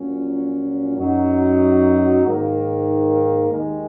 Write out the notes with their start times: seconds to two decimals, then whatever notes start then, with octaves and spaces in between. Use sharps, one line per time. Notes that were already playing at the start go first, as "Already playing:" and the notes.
Already playing: A#1 A#2 F#3 C#4
0.96 F#2 F#3 D#4 F#4
2.24 G#2 D#3 A#3
3.51 D#2 D#3 G#3 D#4